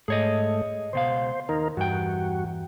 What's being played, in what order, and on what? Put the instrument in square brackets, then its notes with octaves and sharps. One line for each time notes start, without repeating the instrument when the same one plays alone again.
[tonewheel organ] G#2 A3 [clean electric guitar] G#4 C#5 D#5
[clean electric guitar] C#2 B2 F5 [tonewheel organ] C5
[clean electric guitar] D#2 [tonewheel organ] D#4 A#4
[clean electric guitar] E2 G5 [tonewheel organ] G2 F#4